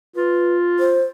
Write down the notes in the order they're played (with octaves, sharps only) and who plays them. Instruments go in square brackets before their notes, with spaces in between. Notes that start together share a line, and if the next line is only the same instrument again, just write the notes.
[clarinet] F4 [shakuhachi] B4
[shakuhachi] C5